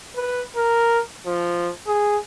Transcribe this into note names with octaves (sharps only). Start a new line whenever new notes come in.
B4
A#4
F3
G#4